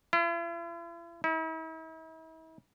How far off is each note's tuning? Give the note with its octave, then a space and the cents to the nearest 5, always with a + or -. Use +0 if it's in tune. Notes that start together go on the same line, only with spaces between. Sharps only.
E4 +45
E4 -45